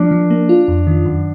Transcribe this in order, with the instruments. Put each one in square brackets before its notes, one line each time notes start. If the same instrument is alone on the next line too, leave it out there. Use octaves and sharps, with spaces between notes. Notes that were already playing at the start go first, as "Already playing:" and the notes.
Already playing: [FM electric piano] F3 A#3 [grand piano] D4
[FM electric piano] F3
A#3
F4
F2
D#3
F#2